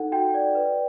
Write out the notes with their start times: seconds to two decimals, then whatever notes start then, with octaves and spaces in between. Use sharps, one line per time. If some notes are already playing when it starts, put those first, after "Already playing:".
Already playing: D#4 A4 F#5
0.12 F#4 G5
0.34 D5
0.55 B4